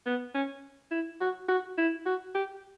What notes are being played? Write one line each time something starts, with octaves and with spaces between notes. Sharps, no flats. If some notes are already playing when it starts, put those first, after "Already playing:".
B3
C#4
E4
F#4
F#4
E4
F#4
G4